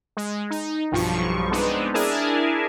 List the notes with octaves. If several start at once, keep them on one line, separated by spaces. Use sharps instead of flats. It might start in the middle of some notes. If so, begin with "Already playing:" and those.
G#3
D#4
B1 G2 F3 C#6
G#3 B3 C4 D4 D#4
D4 E4 G#4 A#4 G#5 A5